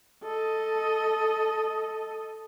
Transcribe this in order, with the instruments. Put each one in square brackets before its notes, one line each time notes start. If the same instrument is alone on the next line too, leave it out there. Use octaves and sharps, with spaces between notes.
[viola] A4 D#5